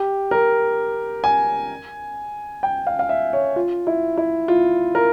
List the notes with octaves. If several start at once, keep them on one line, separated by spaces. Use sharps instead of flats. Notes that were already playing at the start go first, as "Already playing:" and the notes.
Already playing: G4
A#4
G#5
G5
F5
F5
E5
C#5
F4
E4
E4
F4
A#4